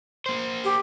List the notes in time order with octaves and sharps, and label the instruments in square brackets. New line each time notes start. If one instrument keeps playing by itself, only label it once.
[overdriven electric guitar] A#3 C5
[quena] G4